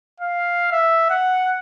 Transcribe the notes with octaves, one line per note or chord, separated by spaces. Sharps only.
F5
E5
F#5